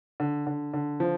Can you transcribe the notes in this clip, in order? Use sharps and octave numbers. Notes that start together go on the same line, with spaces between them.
D3
D3
D3
F3